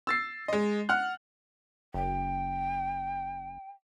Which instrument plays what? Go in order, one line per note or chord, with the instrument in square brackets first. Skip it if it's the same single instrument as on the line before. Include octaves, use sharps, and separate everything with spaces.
[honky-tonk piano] E6 A6 C7
G#3 D#5
F#5 F6 F#6
[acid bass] F#1 [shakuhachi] G5